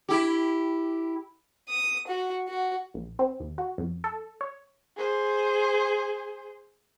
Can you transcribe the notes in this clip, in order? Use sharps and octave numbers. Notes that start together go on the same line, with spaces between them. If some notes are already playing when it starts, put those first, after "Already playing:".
E4 G4
D#6
F#4
F#4
A#1
C4
D#2
F#4
F2
A4
C#5
G#4 C5